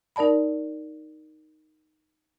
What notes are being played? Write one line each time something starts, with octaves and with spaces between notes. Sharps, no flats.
D#4 A#4 D5 A5 B5